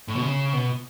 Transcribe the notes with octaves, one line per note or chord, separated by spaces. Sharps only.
A2
B2
C#3
B2